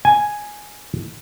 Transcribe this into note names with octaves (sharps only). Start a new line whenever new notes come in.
G#5